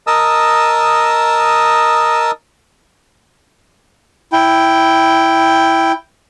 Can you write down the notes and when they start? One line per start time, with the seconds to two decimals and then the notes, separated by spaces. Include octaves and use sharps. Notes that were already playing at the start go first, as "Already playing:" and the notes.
0.07 A#4 D#5 A5 D#6 E6
4.33 E4 G5